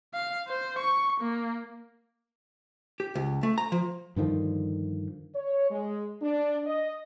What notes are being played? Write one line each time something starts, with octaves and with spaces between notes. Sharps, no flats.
F5
C5
C#6
A#3
G4
C#2
A3
A#5
F3
G2 D3 D#3 F3
C#5
G#3
D4
D#5